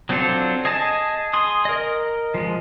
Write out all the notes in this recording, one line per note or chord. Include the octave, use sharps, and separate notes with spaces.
F#3 C4 D4 F4 A4
G#4 D#5 G#5 A5
G#4 C6 D#6
A#4 D#5
F3 G#3